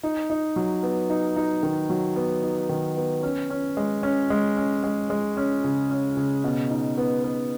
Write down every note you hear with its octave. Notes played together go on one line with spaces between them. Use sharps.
D#4
D#4
F#3
B3
D#4
D#4
D#3
F#3
B3
D#4
D#3
B3
C#4
C#4
G#3
C#4
G#3
C#4
G#3
G#3
C#4
C#3
C#4
C#3
B2
D#4
B3
B3